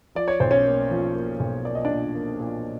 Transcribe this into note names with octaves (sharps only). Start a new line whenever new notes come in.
F3 D5
C#5
B1 C5
C#4 C#5
A#3
F3
A#3
B1
A#3 D5
D#5
D4 D5
A#2
A#3
A#2